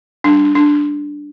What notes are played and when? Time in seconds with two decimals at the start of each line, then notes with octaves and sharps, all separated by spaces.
0.24 G3 D4
0.44 D4
0.55 D4